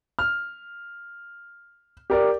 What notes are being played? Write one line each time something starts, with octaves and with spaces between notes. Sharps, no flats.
F6
G4 A#4 D5